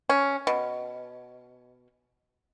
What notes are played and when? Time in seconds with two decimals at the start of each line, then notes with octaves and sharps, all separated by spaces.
0.09 C#4
0.47 B2